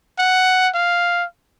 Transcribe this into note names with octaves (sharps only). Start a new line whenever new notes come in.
F#5
F5